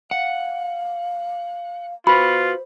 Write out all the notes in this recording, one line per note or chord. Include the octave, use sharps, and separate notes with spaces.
F5 F#5
F4 F#4 B4 C5 B5